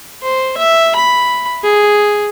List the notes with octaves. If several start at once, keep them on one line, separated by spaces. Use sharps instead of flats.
C5
E5
B5
G#4